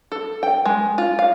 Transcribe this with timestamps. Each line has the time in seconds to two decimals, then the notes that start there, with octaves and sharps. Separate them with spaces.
0.12 A4
0.43 G5
0.65 G#3
0.98 F4
1.19 F5